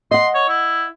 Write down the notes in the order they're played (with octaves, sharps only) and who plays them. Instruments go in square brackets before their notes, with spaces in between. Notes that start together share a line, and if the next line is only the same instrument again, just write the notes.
[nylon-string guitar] D#5 F#5 [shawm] C6
[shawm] C#5
E4